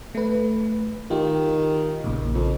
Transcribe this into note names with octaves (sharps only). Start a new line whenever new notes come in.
A3 B4
D#3 F4 G4
A#1 A#2 C#3
F2